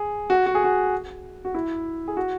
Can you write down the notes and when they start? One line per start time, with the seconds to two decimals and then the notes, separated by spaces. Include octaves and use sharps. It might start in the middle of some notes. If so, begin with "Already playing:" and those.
Already playing: G#4
0.30 F#4
0.46 F#4
0.55 G#4
0.64 F#4
1.45 F#4
1.54 E4
2.08 G#4
2.17 F#4